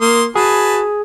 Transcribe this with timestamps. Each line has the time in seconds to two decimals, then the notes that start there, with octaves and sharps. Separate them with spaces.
0.01 A#3 C6 D#6
0.35 F#4 G#4 B4 G#5 A5